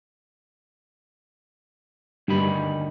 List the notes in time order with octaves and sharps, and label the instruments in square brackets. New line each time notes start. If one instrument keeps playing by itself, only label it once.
[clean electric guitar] D2 D#3 B5 [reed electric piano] G2